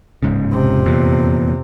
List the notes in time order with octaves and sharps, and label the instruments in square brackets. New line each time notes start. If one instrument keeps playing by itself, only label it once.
[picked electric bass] D1 G#2 C#3
[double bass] F2 C3
[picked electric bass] E2 A#2